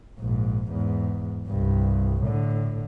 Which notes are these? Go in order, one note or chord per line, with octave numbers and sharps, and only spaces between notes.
A#1 G#2
E2 G#2
C2 G2
A2 D3